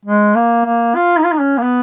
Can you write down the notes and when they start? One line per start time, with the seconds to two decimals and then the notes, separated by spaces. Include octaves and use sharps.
0.05 G#3
0.35 A#3
0.65 A#3
0.95 F4
1.18 D#4
1.24 F4
1.32 D#4
1.40 C#4
1.57 A#3
1.62 B3